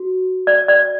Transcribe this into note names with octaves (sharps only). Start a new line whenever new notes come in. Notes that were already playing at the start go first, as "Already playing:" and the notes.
Already playing: F#4
D5
D5